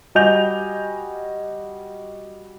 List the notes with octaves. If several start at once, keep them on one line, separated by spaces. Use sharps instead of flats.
G3 F#4 D#5 G#5 G6 F7